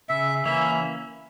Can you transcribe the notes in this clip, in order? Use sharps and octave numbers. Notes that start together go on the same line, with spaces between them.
C#3 E5
E3 A#3 C#4 E5